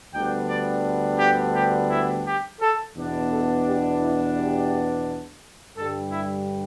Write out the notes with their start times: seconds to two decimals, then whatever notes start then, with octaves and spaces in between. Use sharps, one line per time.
0.13 D2 D3 G3 B3 D4 G5
0.49 D5
1.20 G4
1.55 G4
1.90 E4
2.26 G4
2.60 A4
2.96 E2 B2 B3 D4
3.31 A4
3.66 G4
4.02 E4
4.37 G4
5.77 G2 D3 G3 A4
6.12 E4